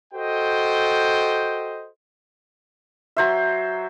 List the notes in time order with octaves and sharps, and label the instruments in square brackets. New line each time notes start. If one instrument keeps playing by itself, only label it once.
[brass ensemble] F#4 A4 C5 D#5 G5
[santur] F#3 C5 E5